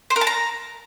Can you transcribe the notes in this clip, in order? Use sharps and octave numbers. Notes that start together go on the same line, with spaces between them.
C5
A#4
A5
A#5